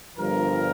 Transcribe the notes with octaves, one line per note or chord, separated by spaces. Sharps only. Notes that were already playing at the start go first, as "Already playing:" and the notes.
G1 G2 F3 A#4